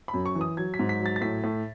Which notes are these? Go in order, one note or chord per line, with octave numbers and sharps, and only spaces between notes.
B5
F#2
C#6
E3
D#6
F#3 G#6
B6
G#2
B6
F#3
A6
A6
A2 B6
A2